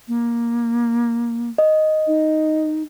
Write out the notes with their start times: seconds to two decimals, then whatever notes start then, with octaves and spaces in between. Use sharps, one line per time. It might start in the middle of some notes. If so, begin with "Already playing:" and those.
0.08 A#3
1.58 D#5
2.07 D#4